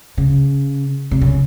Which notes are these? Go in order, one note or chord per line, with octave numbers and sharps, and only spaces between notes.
C#3
C3
C#3